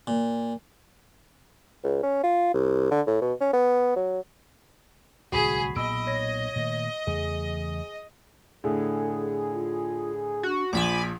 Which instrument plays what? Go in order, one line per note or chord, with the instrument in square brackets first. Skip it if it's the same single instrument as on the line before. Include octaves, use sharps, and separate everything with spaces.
[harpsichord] A#2
[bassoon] C#2
C#4
F4
C2
D3
A2
B2
C#4
B3
F#3
[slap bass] D1 C2 A2 [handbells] F#4 B5 B6 [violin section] G#4
[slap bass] B1 A#2 B3 [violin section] D#5 [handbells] B5 E6 D7
[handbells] C#5 A#6
[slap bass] A#2 D#3 A3
[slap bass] E2 C#3 A3 [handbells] G#4
[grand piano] A2 D3 E4 [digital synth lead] G#4 [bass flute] A4
[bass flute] F4
[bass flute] D4 [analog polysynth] F#4
[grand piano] A#1 F3 E7 [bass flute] F4 [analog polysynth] G#5 B5 D6